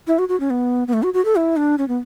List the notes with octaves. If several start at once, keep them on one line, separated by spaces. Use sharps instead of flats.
E4
F#4
F#4
C#4
B3
B3
A3
F#4
F#4
A4
E4
D4
C#4
B3